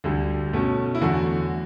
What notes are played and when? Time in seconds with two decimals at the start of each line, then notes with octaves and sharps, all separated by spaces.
0.04 D2 D3 G3
0.53 B2 A3 C#4
0.95 E4
1.01 E2 D3 F#3 A3 F#4